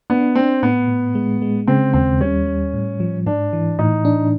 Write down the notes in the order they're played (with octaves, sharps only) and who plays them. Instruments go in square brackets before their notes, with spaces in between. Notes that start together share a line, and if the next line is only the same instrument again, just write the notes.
[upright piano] B3 [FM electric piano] D4
[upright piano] C4 [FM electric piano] D4
[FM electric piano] A2 [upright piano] B3
[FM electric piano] A2
G#3
G#3
[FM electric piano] C#3 [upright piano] C4
[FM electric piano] D#2 [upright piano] C4
[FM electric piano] G3 [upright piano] C#4
[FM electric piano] G3
A2
F3
[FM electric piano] G#2 [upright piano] D4
[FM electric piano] E3
[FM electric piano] A2 [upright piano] D#4
[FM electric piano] D4